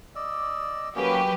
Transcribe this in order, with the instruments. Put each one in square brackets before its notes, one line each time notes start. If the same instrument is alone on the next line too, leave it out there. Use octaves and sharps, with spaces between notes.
[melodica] D5 D#5 E6
[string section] F#3 G4 B4 [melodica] A#3 C#4 F#4